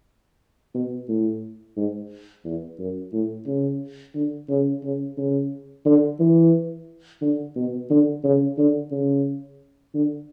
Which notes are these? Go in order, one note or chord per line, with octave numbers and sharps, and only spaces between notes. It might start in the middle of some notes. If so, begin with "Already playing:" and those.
B2
A2
G#2
E2
F#2
A2
C#3
D3
C#3
C#3
C#3
D3
E3
D3
B2
D3
C#3
D3
C#3
D3